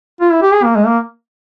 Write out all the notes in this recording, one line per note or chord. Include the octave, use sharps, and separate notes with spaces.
F4
E4
G4
G#4
A#3
G#3
A#3